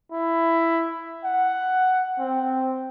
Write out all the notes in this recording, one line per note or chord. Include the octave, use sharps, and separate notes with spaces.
E4
F#5
C4